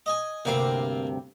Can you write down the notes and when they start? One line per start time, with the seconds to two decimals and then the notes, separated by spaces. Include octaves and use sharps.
0.06 D#5 G#5
0.45 D2 G2 C3 A#3 C4 A#4